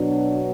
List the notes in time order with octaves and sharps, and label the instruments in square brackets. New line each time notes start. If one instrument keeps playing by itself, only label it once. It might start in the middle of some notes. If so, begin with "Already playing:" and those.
Already playing: [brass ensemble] B2 F#3 D4